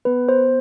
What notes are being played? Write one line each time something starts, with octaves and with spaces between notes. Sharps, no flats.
B3 B4
B3 C5